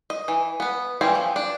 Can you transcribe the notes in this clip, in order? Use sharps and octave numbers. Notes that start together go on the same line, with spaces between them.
D#5
E3
B3 B4
E3 G3 A3 C4 C#4
F3
D4